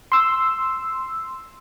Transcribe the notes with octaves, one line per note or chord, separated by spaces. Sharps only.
C6 E6